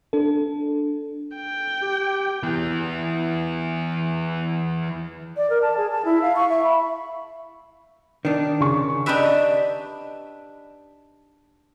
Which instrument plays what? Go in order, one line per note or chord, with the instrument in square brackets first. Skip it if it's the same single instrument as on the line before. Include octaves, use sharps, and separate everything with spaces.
[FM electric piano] D4 A4
[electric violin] G5
[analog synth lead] G4
[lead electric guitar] E3 B3
[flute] D5
A#4
A5
G#4
A5
E4
F5
C#6
E5
B5
[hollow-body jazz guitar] D#3 D4
[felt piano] C#3 C#6
[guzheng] D4 D#4 G4 B4 E5